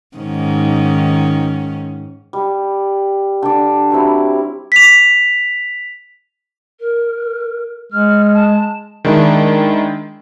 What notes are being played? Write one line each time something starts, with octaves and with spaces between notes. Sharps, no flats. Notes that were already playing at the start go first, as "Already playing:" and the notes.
G#2 D#3 C#4
G3
D3 D5
F#3 G3 C4 E4
B6 F7
A#4
G#3 F6
A5
D#3 G#3 D4 E4